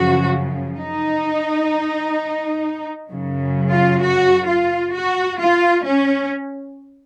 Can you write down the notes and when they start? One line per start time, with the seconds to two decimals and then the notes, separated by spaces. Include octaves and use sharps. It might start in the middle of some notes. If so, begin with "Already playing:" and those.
Already playing: F#2 C#3 F3 F#4
0.78 D#4
3.08 F#2 C#3 F#3
3.70 F4
4.02 F#4
4.48 F4
4.93 F#4
5.40 F4
5.86 C#4